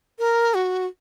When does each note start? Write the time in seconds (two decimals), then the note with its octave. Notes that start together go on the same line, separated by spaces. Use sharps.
0.19 A#4
0.54 F#4